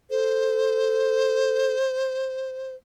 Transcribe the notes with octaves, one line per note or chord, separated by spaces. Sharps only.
A4 C5